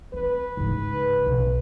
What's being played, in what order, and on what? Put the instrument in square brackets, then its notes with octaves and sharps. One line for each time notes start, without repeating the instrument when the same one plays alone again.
[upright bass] C4 [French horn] B4
[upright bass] G#2 C#3
B1